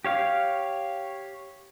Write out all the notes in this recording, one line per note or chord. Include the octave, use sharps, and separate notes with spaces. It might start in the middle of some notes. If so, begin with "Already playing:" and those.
G4 C#5 F5